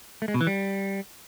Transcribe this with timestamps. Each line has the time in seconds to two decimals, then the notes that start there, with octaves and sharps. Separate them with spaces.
0.22 A3
0.28 G#3
0.34 B2
0.41 E3
0.47 G3